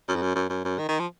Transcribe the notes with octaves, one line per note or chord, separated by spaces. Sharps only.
F#2
F2
F#2
F#2
F#2
F#2
D#3
D#3
F3